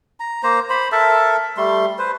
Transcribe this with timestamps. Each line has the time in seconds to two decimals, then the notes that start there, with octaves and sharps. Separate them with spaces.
0.20 A#5
0.43 A#3 C5 A#5
0.70 C5 B5
0.92 A4 A#4 E5 A5
1.57 G3 A3 C6
1.99 B4 C5